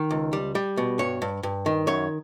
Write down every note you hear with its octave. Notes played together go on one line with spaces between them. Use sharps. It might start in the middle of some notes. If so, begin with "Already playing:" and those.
Already playing: D#3
C#2
G3
G3
B2
G2 C#5
G2
G2
D#3
F#2 C#5